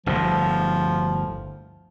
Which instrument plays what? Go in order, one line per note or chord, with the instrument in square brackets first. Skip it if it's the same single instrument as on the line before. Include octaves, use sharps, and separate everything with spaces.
[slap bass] G1 D2 A2 [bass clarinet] F3